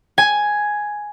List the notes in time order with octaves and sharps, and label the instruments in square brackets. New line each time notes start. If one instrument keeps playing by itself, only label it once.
[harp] G#5